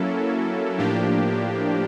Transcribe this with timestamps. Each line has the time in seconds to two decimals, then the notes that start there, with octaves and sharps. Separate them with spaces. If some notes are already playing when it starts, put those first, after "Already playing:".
Already playing: F#3 A#3 C#4 E4 A4
0.78 A2 F3 A#3 D4 G4